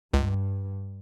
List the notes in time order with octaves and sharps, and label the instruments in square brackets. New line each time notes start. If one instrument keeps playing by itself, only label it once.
[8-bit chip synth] C#2 [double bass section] G2